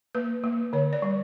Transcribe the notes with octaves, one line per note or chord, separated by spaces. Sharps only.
A#3 B4
A#3
D3 C#5
D5
G3